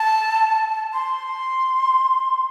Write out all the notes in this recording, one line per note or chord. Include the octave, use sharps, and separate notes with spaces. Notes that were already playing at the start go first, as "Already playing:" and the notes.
Already playing: A5
C6